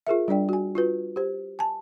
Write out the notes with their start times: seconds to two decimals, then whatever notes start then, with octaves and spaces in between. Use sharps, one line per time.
0.07 F4 G#4 A#4 E5
0.28 G3 D4 D5 G5
0.49 F#4 G#5
0.75 F4 F#4 B4
1.16 G4 C5
1.59 G#5 A5